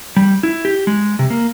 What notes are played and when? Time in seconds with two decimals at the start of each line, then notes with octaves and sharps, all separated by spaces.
0.17 G3
0.43 E4
0.65 G4
0.87 G#3
1.19 C3
1.30 A#3